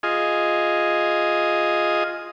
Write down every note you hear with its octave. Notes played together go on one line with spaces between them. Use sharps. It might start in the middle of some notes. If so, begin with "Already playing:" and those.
F4 G#4 D#5